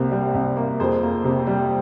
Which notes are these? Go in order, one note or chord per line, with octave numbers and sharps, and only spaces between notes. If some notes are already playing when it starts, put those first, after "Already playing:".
Already playing: C2 C3 A#3
G3
C2
A#3
F2 G#4 C5
A#3
C3
G3